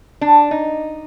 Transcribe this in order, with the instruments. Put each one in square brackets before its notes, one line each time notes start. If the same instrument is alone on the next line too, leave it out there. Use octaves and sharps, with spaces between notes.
[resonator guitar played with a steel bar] D4
D#4